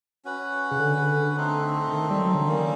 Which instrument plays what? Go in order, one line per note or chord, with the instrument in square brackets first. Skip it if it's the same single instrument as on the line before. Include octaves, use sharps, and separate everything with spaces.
[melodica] C#4 F#4 B4
[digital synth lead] C#3
D3
[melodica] A3 C4 D#4
[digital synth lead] D3
D#3
G3
F#3
D3
[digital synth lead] D#3 [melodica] G3 A#3 C#4